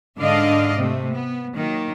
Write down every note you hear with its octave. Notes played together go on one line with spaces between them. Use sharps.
G#2 D3 D4 D5 D#5 F5
C3 A3
B3
D#3 F#3 A#3